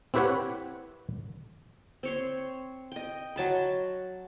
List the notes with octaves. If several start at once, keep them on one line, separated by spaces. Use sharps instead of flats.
C4 E4 G4 B4 C#5 F#5
C4 C#5 C6
D#5 G5
F#3 A5 B5